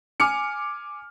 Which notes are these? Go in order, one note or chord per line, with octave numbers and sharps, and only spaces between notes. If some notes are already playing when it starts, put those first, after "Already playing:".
G#5 D6 F6 C#7